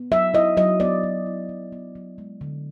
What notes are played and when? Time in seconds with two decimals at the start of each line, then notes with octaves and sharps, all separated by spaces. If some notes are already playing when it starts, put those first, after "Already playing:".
Already playing: B3
0.12 F#3 E5
0.34 E4 D#5
0.57 F#3 D#5
0.80 B3 D5
1.03 F#3
1.26 E4
1.49 F#3
1.72 B3
1.95 F#3
2.18 G#3
2.41 D3